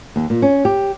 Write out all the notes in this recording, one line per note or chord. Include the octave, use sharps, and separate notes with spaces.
D#2
A#2
C#4
G4